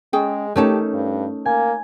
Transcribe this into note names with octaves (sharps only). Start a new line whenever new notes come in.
G#3 C#4 G#4 G5
A3 C#4 D#4 G4 A#4 C#5 A5
G2
A#3 G#5